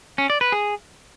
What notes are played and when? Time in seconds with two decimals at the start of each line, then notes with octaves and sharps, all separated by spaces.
0.18 C#4
0.30 D5
0.41 B4
0.52 G#4